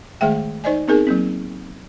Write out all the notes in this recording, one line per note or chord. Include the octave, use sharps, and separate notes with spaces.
D#3 G#3 A3 G#4 E5 G5
D#4 C5 D5 D#5 G#5
B3 C4 D#4 G#4 A#4 G#5
F#3 A#3 C4